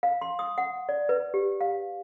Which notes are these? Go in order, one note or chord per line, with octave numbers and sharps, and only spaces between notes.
F5
C6
D#6
F#5
D5
B4
G4
F5